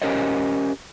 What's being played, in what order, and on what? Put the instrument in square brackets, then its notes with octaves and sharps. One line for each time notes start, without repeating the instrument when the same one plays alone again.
[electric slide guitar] C#4 G4 A#4 C5 C#5 D#5